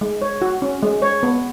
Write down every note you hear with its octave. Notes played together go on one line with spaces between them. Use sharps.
G#3
C#5
F#4
C#4
G#3
C#5
B3